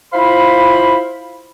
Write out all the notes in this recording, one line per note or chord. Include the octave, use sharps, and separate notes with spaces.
E4 F4 C5 F5 B5